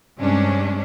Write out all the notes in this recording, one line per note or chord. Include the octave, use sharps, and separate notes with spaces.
G2 C3 G#3 C#4 D4